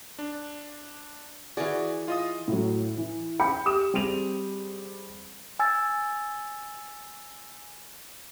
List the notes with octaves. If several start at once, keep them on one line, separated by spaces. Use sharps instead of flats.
D4
E3 F#4 G#4 D5
F4 D#5 D#6
A2 F#3
E3
G5 B5 G6 C#7
G4 D#6 E7
G3 C4 G#4 D#7 F7
G#5 E6 A6